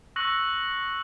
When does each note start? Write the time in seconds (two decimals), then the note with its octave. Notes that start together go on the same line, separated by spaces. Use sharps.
0.16 C#6 E6 F#6 A#6 C#7 F#7